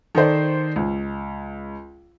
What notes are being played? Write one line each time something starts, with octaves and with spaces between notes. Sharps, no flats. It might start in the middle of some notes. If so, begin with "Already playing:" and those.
D#3 A4 C5 D5
C#2